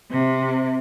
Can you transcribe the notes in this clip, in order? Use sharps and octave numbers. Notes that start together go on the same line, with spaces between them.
C3